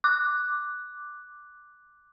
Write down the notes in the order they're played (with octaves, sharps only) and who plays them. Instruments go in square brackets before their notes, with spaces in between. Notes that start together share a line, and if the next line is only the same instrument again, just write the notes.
[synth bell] D6 F#6